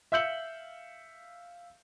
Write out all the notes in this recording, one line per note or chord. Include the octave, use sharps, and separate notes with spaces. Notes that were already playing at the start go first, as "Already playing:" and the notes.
E5 F5 E6 G6 C#7 F#7